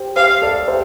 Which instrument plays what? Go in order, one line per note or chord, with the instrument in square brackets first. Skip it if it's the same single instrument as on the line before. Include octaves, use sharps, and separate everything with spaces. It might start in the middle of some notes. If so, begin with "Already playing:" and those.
Already playing: [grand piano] G4 C5
[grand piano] G4 C5 [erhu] F5
[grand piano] A4 D5
G4 C5